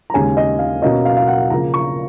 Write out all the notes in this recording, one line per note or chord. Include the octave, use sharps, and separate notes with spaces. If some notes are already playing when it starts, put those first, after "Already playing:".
A#5
D#2 C#3 G#3 C#4 G#5
D#5
F5
B2 A#3 C#4 D#5
F5
F5
F#5
C#3 F3 A#3 A#5
C#6